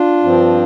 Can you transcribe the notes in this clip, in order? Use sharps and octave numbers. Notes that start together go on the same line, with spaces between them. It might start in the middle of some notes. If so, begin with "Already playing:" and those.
Already playing: D4 F4
G2 F3 C4